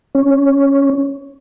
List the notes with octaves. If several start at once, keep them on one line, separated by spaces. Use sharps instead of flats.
C#4